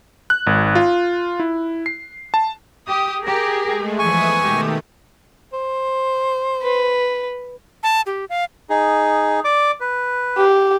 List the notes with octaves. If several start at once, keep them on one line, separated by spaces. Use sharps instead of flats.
F#6
G#1
F4
E4
C7
A5
G4 D#6
G4 G#4 A#4
G#3 A3
E2 F3 B4 E5 G#5 C#6 D#6
B2 D#3 G#3 A3 G4
C5
B4
A5
G4
F5
D#4 G#4
D5 D6
B4
G4